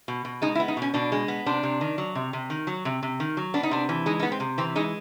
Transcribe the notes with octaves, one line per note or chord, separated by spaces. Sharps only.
B2
B2
G#3 D#4
E4
B3
D#4
B2 C#4
B2 D4
G#3
B3
C3 D4
C3
D#3
F#3
C3
C3
D#3
F#3
C3
C3
D#3
F#3
B3 D4
D#4
C3 D4
E3
G#3 D#4
D#4
B3
C4
C3
E3 C4
G#3 D#4